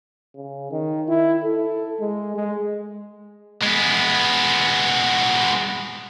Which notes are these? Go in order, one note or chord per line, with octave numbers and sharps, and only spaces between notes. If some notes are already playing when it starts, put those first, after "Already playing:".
C#3
D#3
E4
A4
G#3
G#3
G#3 B3